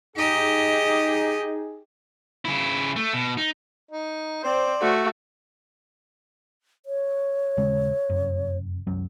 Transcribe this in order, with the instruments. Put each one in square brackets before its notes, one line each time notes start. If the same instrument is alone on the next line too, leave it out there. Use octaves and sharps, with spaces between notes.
[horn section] D#4 G#4 [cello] G4 D#5
[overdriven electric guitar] C#3 E4
A3
B2
D#4
[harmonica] D#4
[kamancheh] C4 [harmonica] C5 D5
[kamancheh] A3 F#4
[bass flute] C#5
[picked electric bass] D#1 C#3 G#3
F1 F#2
C2 F#2 F#3